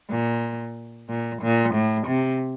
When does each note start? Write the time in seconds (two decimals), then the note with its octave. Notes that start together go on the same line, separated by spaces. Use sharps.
0.10 A#2
1.09 A#2
1.42 A#2
1.74 A2
2.07 C3